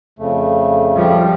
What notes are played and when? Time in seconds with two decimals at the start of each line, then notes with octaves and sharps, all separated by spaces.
0.19 F2 C#3 A3
0.95 F3 G3